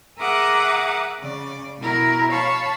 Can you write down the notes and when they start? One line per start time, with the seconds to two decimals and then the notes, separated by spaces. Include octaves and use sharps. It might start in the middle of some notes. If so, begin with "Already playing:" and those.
0.19 G#4 A#4 E5 F#5 D6 D#6
1.20 C#3 D5
1.79 B2 E4 A#4
2.31 C#5 F5 A5 B5 C#6